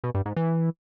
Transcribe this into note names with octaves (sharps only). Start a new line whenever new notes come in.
B2
G2
G#2
E3